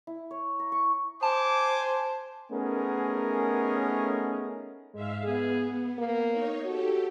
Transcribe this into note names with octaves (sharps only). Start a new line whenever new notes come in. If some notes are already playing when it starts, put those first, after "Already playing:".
E4
C#5
A#5
C#6
C5 G#5 A5 D6
A3 B3 C#4 D#4 G#4 A#4
G#2 G#3 E5 F5
B3 G#4
A#3
D#4 C#5
F#4 G4 A4